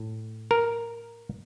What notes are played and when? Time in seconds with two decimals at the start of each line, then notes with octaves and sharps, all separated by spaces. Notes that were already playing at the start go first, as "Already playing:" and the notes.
Already playing: A2
0.51 A#4